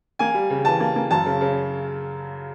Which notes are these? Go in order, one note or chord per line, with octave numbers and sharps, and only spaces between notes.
A#3 G#5
G3
C#3
E3 A5
A#3
A#3
F#2 A5
C#3
C#3